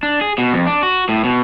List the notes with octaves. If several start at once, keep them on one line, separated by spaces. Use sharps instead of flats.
D4
G#4
B2
F2
D4
F#4
A2
B2